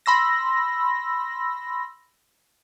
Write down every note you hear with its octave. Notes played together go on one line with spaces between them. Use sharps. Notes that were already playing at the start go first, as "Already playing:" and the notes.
B5 C6 E6 A#6